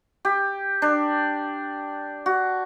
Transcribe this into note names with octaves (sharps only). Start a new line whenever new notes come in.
G4
D4
F#4